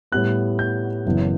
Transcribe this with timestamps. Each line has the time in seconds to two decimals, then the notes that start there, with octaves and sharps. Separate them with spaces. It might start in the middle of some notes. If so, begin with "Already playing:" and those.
0.12 A2 G3 B3 F#6
0.59 G6
1.06 F#1 F#2 E3 B3 E4